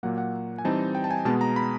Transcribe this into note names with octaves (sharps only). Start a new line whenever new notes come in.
A#2 F#3 A#3 F#5
F#5
G#5
E3 G3 C4 D#4 A5
G5
A5
G#5
B2 G#3 B3 A5
A#5
B5